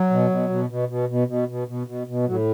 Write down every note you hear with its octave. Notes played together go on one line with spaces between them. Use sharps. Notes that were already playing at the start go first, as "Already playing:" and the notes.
Already playing: F#3
B2
B2
B2
B2
B2
B2
B2
B2
B2
B2
B2
A2 F#3